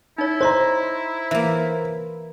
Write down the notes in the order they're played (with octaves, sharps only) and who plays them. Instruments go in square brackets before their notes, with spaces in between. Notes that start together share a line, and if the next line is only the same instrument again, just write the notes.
[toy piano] D#4 C#5 [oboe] E4
[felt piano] C5 A#5 [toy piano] C#5 D#5 C6
[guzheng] E3 A#3 [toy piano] E5